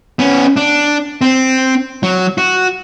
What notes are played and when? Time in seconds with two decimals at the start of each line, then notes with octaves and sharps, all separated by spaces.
0.19 B3 C#4
0.57 D4
1.21 C4
2.03 F#3
2.38 F#4